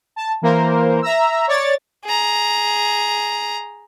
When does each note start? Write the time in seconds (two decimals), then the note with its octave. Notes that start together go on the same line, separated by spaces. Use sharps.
0.16 A5
0.42 E3 A#3 A#4 C5
1.02 E5 A#5 E6
1.48 C#5 D5 A6
2.04 G#4 A#5